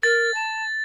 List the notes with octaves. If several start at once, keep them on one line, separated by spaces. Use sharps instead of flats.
A#4 A6
A5